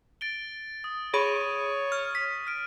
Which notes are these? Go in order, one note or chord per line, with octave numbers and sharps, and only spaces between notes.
A6 D7 G7
D#6
G#4 C#5 B5 D#7
F6
B6
F6 D7